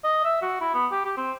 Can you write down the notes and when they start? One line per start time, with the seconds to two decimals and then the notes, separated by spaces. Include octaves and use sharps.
0.04 D#5
0.25 E5
0.42 F#4
0.61 E4
0.74 B3
0.91 G4
1.05 G4
1.17 C4